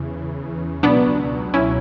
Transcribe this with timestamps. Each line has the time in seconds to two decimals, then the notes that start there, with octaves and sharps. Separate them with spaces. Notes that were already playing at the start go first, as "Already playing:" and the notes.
Already playing: E2 C#3 E3
0.83 C#2 B2 F#3 B3 D4
1.54 C#4 E4